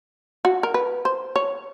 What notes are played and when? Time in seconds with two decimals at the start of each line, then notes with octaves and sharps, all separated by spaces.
0.45 F#4
0.63 A#4
0.74 B4
1.05 C5
1.36 C#5